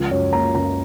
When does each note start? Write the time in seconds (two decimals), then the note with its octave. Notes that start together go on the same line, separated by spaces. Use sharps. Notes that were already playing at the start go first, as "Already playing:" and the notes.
Already playing: C#2 F3
0.11 F#2 C#5
0.33 A#3 A#5
0.55 F#2 A#5